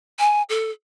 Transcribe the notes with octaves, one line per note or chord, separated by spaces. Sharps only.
G#5
A4